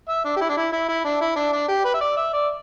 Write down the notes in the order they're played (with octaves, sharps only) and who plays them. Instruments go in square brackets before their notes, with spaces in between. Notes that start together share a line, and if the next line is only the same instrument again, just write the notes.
[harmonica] E5
D4
G4
E4
D4
E4
E4
E4
D4
E4
D4
D4
G4
B4
E5
D5
E5
D5